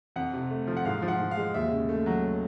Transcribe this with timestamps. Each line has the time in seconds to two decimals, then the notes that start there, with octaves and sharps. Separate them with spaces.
0.16 F2 F#5
0.33 C3
0.51 A3
0.67 F3
0.77 F#5
0.85 G#2 F5
1.02 F3
1.08 F#5
1.20 G#2
1.31 F5
1.37 G#3
1.54 D#2 E5
1.71 C#3
1.89 A3
2.06 F#3